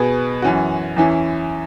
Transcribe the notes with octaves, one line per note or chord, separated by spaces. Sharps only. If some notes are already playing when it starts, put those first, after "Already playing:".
Already playing: B2 B3 G#4 B4
F#2 E3 C#4 F#4
E2 E3 C#4 E4